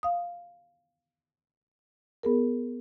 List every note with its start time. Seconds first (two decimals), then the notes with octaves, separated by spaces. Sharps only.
0.03 F5 D#6
2.23 B3 G#4 A#4